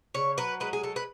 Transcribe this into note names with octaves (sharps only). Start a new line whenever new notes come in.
C#3 C#5
F#3 B4
G#3 B4
G#4
G#3 A4
B4